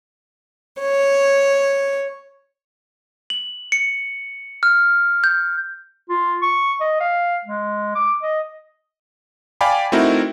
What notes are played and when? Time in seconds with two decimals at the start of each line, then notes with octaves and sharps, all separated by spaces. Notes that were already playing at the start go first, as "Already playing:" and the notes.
0.82 C#5
3.30 F#7
3.72 C#7
4.63 F6
5.24 G6
6.09 F4
6.42 C#6
6.80 D#5
7.00 F5
7.45 G#3
7.95 D6
8.22 D#5
9.61 D5 F5 G5 G#5 B5 D6
9.92 A3 C4 D#4 E4 F#4 A#4